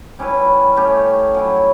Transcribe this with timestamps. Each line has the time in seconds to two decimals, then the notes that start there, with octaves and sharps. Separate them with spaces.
0.19 G3 C#4 E4 B4
0.76 A3 C#4 G4
1.34 F#3 C#4 E4